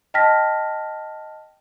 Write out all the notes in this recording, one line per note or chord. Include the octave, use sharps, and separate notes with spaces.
D#5 G5 A5 F6 A#6 B6